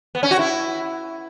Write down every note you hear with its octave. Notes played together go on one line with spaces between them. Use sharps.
B3
C#4
F#4
E4